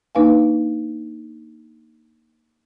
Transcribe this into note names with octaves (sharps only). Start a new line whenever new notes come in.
A#3 D4 D#4 B4 F5 G#5